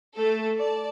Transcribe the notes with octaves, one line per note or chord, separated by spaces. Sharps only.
A3 A4
D5 A5